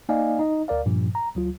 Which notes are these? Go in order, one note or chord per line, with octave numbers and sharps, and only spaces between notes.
A#3 D#4 D5 D#5 F5 G#5
D#4 D#5
D2 A#4 D5 F5
G2 A#2 F3
A#5
D2 F#3 F4